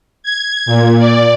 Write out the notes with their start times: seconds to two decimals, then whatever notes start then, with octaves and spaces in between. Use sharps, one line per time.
0.23 G#6
0.66 A#2
0.99 D5